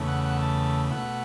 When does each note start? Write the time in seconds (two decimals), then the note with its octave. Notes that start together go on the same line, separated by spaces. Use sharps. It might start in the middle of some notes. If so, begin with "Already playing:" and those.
Already playing: E2 C#3 A3
0.08 F#5
0.25 F#5
0.42 A5
0.91 B2 A3 F#5